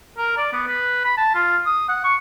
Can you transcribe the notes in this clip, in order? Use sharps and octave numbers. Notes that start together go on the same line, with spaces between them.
A#4
D5
B3
B4
B5
A5
F4
D#6
F#5
C#6